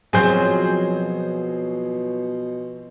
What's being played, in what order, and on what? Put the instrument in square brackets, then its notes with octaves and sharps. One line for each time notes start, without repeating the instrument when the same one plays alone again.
[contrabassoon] B2 [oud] F3 F#3 C4 [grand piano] G#4 C5 [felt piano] G#5 G6